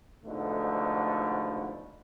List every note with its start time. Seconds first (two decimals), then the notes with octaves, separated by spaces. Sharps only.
0.25 G#2 B2 D3 F3 A3